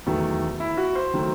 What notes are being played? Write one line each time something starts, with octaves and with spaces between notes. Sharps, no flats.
E2 D#3 F#3 A3
E4
F#4
C5
D#3 F#3 A3